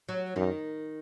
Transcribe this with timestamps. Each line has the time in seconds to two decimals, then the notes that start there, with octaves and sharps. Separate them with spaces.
0.09 F#3
0.36 F#2 D#3